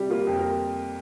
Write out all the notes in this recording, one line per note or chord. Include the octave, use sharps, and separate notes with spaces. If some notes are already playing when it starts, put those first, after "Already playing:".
Already playing: C3 G3 G4
A#3 F4
F2
A#4